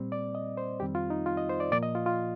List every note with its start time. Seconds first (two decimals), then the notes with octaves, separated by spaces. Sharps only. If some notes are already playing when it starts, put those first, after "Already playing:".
Already playing: A#2 G3 C4
0.12 D5
0.35 D#5
0.57 C5
0.80 F2 D#3 G3 C4 G4
0.95 F4
1.10 D#4
1.26 F4
1.37 D#5
1.49 C5
1.60 D5
1.71 A#2 F3 A#3 D5
1.83 D#5
1.95 F4
2.06 F4